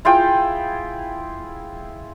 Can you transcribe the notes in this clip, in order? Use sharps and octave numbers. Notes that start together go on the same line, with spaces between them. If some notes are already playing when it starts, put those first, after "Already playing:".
E4 F4 G#4 G5